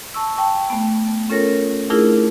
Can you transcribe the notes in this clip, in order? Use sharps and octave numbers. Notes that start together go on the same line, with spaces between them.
A5 C#6 E6
G5 A5 C#6
A3 B3
C#4 F4 A4 A#4 C#5 A#6
A3 D4 E4 F4 G#4 A#4